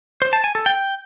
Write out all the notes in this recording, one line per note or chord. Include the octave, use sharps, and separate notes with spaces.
C5
A5
G#5
A4
G5